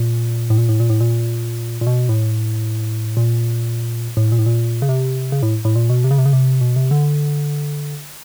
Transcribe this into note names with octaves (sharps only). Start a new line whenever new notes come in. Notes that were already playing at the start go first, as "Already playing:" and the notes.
Already playing: A#2
A2
A#2
A2
A#2
A2
A#2
A#2
B2
A2
A#2
A2
A#2
A2
A#2
C#3
C3
C#3
A2
A2
A#2
B2
C3
C#3
C3
C#3
C3
B2
C3
D3